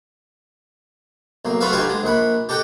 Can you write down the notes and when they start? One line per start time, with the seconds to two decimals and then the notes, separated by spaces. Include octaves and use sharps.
1.45 B1 A#3
1.61 A3 F4 F#4 B4 E5 F5
1.73 D3 D#4 F4 G4 B4 G#5
1.87 D3 G#3
2.03 A#1 A#2 F#5 B5
2.49 G4 A4 D#5 F#5 G5